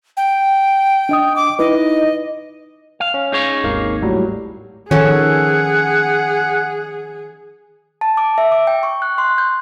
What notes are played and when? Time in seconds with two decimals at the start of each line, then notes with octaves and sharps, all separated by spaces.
0.17 G5
1.09 D4 D#5 D#6
1.36 D6
1.59 D#4 E4 B4 D#5
3.00 F5
3.14 C#4
3.32 D#4 G#4 C#5
3.64 G#1 D#2 A#3 F5
4.02 A2 F#3 G3
4.91 D#3 F3 C#4 G#4 A4 F#5
8.01 A5
8.17 D6
8.38 E5
8.52 D6
8.67 G5
8.83 C#6
9.02 F#6
9.18 C6
9.38 G6